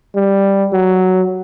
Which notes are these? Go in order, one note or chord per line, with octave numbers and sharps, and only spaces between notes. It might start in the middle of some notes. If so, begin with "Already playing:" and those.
G3
F#3